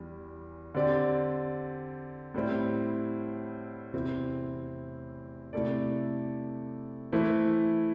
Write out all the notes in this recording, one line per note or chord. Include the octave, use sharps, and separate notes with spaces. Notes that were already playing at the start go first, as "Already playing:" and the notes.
Already playing: E2 E3 G3
D3 C4 G4 D5
A2 G3 C4 E4
E2 C3 E3 C4 E4
C3 A3 E4 A4 D5
E3 A3 E4 C5